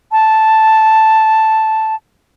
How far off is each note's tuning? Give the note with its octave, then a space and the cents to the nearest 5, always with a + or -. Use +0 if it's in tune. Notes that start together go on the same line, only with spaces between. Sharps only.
A5 -5